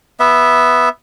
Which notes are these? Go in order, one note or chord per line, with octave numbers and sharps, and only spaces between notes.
B3 E5